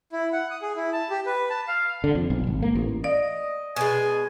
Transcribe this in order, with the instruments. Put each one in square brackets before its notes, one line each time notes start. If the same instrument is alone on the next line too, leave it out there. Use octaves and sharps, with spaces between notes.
[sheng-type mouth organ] E4
F#5
D#6
G#4
E4
A5
G4
B4
A5
F5
[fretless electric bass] D3
F2
B1
G#1
A#3
A1
[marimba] D5 F5 [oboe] D#5
[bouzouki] B2 G#3 [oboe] G#5